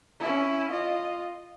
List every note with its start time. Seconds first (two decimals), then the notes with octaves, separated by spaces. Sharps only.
0.20 C#4 E4
0.71 F4 D#5